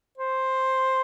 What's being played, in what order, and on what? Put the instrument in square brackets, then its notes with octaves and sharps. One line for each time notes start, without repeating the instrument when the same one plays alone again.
[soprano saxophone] C5